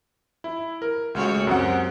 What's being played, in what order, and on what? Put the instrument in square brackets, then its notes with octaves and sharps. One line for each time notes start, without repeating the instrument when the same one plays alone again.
[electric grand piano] E4
A#4
[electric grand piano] C#2 A3 [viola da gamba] G#3 F#4 C#5
[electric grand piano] F#2 F#3 F#5 [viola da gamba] C4 G4